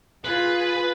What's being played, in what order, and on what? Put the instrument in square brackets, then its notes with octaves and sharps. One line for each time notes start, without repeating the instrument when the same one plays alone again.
[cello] F4 G#4 [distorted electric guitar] B4